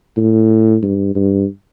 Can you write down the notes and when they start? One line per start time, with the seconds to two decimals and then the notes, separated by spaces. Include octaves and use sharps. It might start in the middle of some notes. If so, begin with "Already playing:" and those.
0.17 A2
0.82 G2
1.15 G2